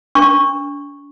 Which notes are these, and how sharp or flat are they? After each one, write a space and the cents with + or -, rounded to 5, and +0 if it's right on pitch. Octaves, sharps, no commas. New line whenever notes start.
D4 -40 C#6 -5